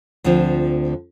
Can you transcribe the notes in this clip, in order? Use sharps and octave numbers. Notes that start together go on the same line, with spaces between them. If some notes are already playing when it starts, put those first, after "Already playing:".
D2 D3 F3 C4 F4